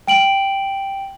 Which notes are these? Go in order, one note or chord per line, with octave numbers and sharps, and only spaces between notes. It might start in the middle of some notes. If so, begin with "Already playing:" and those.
G5 D7 F#7